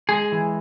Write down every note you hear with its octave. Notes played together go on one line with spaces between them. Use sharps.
G#3 G#4
E3